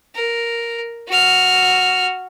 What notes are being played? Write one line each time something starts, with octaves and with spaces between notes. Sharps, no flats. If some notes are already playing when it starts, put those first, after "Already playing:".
A#4
F#4 F6